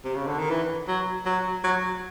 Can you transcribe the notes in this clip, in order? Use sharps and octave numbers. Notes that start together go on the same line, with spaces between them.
C3
C#3
D3
D#3
E3
F#3
F#3
F#3